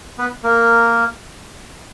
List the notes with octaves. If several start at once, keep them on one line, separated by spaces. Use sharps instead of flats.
B3 B4
A#3 A#4